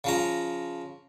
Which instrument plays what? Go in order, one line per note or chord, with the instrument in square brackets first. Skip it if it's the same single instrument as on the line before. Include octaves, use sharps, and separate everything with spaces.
[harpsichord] C#3 F3 A#5